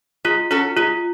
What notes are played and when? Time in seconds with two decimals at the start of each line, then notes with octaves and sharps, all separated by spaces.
0.25 G#3 F4
0.51 C#4 F4 F#4 A4
0.77 G#3 F4